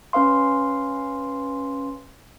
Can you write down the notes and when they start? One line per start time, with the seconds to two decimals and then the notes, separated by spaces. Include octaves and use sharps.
0.13 C#4 B4 F5 C6